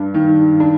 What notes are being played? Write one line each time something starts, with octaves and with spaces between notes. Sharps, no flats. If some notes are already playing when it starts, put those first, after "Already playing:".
Already playing: G2 D4
D#3
D4